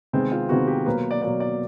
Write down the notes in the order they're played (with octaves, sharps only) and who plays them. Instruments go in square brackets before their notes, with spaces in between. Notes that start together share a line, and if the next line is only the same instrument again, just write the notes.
[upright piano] C3 D#3 G#3 B3 [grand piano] C4
[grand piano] F4
[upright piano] C3 D#3 G#3 B3 [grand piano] F#4
[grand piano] G4
[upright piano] B2 F#3 A#3 [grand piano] B4
[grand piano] D5
[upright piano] B2 F#3 A#3 [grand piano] D5
[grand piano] D5